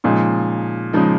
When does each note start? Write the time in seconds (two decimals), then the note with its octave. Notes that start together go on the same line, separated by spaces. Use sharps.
0.04 A#2 C#3 F3 G#3 D#4
0.93 C#3 F3 G#3 D#4